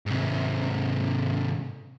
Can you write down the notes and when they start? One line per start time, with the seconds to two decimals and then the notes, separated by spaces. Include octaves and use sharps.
0.06 G#2 C3